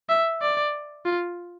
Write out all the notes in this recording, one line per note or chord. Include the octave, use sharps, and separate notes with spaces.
E5
D5
F4